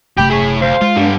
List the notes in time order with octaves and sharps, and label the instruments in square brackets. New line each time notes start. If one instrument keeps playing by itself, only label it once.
[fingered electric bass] F#1 C3 A3 [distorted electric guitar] G4 [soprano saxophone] G5 [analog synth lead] B5
[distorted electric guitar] E4 C#5 [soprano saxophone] G#4
[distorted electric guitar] D2 [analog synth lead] C5 [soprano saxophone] F5
[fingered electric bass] G#3 [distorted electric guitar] F4
[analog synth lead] G2 [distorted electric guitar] D3 G3